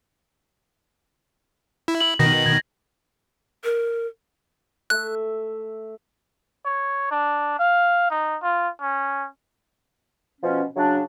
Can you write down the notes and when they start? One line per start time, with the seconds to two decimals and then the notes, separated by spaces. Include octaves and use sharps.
1.88 E4
2.00 F#7
2.19 B2 D#3 A#6
2.46 G#6
3.64 A#4
4.90 A3 E5 F#6
6.65 C#5
7.11 D4
7.59 F5
8.10 D#4
8.42 F4
8.81 C#4
10.41 B2 F3 C#4
10.76 C#3 F#3 D4